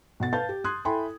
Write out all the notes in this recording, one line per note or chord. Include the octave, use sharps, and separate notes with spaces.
B2 F#5 A6
B4 F5 A5 G6 A6
G4
C6 D#6 F#6 G#6
E4 A4 G5 G#5 B5 C6